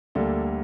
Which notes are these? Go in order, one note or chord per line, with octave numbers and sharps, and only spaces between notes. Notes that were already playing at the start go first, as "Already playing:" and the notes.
D2 D3 G3 A#3 A4